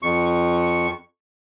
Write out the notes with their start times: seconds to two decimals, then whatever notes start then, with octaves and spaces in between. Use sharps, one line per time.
0.03 F2 C#6